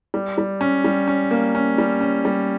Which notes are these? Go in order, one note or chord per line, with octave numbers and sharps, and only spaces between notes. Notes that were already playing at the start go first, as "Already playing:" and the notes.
G3
G3
C#4
G3
C#4
A#3
C#4
G3
C#4
G3